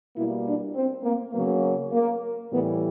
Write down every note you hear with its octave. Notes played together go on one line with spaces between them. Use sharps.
B2 G3 A#3 E4
D4
C4
A#3
C#3 F#3 A#3 B3
A#3
A2 E3 G3 B3